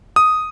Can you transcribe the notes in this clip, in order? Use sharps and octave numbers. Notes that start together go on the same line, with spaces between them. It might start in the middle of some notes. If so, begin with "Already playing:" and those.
D#6